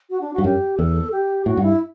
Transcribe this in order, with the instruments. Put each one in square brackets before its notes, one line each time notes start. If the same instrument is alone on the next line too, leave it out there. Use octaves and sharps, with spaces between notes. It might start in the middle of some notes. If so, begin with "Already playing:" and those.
[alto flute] F#4
D4
[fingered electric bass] G2 [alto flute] F#4
[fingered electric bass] F#2 [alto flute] G4
[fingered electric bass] E2 [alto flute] A4
[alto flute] G4
[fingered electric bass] A2 [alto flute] F#4
[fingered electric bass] G2 [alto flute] E4